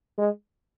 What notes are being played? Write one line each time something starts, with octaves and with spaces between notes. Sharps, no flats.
G#3